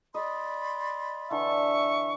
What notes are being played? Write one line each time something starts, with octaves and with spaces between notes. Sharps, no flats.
D5 D#5 B5 C6
D3 E3 E5 C#6